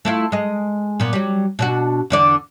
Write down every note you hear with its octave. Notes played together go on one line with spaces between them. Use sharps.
A3 E4 F4
G#3 D#5
A#2 B3
F#3 G3
B2 D4 F#4
E2 D3 D5